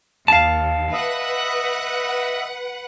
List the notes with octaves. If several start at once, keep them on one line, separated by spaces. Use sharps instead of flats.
D#2 F5 A5
B4 D#5 E5 F#5